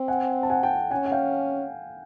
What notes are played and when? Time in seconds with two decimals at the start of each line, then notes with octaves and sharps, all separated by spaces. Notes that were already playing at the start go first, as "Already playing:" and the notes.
Already playing: C4
0.08 F#5 G#5
0.43 A5
0.50 F#5 G#5
0.63 G5 A5
0.91 C#4 F#5 G#5
1.05 F#5
1.12 F5 G5